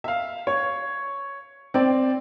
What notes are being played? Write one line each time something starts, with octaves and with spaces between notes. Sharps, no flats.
E5 F5
C#5
C4 D5